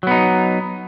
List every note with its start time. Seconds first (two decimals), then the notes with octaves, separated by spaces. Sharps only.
0.03 F#3
0.07 B3
0.11 D#4